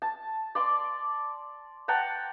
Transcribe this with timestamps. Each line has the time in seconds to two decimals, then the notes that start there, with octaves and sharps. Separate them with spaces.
0.02 A5
0.55 D5 C6 D6
1.88 F#5 G5 A5 A#5